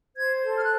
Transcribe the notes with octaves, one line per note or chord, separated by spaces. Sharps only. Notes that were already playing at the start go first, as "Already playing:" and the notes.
C5 G#6
A4
F6
F#6